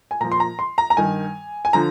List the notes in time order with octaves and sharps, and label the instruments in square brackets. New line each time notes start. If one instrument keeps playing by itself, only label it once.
[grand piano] G#5
A#2 F3 A#5
C6
A#5
C6
A#5
A#5
G2 D#3 G#5
G#5
D3 F3 A#5